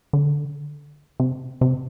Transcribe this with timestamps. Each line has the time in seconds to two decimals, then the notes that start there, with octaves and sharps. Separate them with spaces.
0.13 D3
1.20 C3
1.61 C3